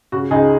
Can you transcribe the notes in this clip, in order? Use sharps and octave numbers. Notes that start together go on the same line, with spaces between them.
C#3 F#4
C#2 D#4 G#4